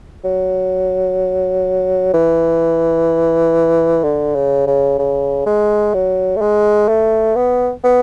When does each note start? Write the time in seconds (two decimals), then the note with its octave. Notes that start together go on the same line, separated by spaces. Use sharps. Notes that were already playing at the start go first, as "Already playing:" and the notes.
0.24 F#3
2.13 E3
4.03 D3
4.35 C#3
4.67 C#3
4.98 C#3
5.46 G#3
5.94 F#3
6.36 A3
6.41 G#3
6.88 A3
7.35 B3
7.83 B3